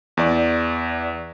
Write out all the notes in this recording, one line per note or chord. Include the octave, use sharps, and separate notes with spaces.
E2 D5